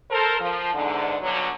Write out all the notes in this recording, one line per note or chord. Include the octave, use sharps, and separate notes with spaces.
A4 A#4 C5
F3
E2 G#2 D3
G2 B2 D3 F#3